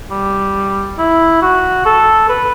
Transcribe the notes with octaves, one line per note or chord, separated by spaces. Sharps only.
G3
E4
F#4
A4
B4